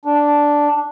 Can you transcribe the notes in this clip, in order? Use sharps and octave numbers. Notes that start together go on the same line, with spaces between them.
D4